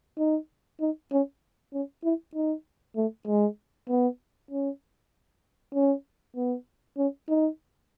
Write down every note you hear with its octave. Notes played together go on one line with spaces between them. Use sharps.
D#4
D#4
C#4
C#4
E4
D#4
A3
G#3
B3
C#4
C#4
B3
C#4
D#4